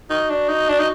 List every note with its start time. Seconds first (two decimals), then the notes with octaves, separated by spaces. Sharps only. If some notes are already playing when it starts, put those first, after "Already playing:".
0.10 D#4 F#4
0.30 D4
0.49 D#4
0.69 D4
0.79 D#4